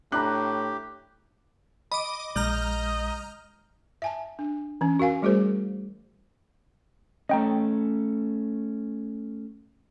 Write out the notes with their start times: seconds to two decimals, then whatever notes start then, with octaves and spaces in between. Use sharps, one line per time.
0.12 A2 D4 G4 A#5 B5 F#6
1.92 D#5 B5 D6
2.36 A#1 G#3 D#5 A#5 F6 G6
4.02 E5 G#5 A5
4.39 D4
4.81 E3 C#4
4.99 F#4 A#4 F5 G#5
5.22 G3 A3 F#4 G#4 A#4 C5
7.29 A3 C#4 D#5 G5 A#5